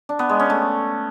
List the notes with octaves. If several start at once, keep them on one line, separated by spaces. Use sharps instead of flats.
D4
B3
G#3
C#4
A3